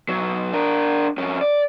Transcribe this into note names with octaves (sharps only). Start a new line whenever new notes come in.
B1 F#3
D4 A#4
F2 C#4
D5